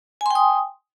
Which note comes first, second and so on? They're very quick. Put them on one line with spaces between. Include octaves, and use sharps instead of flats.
G#5 C6 G5 D#6